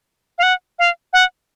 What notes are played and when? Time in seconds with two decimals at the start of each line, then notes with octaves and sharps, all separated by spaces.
0.38 F5
0.43 F#5
0.79 F5
1.13 F#5